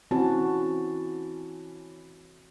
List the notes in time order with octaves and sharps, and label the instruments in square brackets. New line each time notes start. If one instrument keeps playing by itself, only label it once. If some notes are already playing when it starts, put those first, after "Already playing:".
[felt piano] E3 C#4 A5 [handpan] C4 F#4